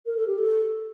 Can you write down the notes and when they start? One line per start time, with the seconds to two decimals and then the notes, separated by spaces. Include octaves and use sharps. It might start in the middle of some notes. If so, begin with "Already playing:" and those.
0.05 A#4
0.16 A4
0.26 G4
0.38 A4